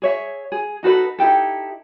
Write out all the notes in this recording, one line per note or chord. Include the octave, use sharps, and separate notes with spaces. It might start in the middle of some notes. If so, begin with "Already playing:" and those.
G#4 C#5 E5
G#4
D#4 F#4 A4 B4
D#4 E4 G4 A4